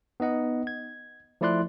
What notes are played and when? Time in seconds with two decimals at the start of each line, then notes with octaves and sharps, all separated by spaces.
0.20 B3 D#4 D#5 F#5
0.67 G#6
1.41 F3 A3 E4 D5 C6 F#6